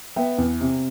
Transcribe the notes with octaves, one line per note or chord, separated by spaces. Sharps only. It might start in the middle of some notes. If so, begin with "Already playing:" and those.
B3 E5 G5
E2
C3